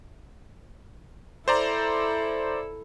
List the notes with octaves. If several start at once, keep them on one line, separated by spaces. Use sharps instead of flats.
E4 A4 C5 D5 A#5